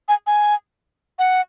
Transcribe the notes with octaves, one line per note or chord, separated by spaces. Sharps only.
G#5
G#5
F#5